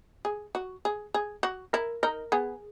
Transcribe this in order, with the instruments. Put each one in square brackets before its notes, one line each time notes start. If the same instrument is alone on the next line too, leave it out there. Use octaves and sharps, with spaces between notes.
[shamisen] G#4
F#4
G#4
G#4
F#4
[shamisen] E4 [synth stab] A#4
[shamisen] D#4 [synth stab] A#4
[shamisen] B3 [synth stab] G#4